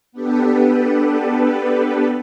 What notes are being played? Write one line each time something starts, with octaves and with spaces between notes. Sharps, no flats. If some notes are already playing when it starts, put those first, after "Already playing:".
B3 D4 G4 A4 B4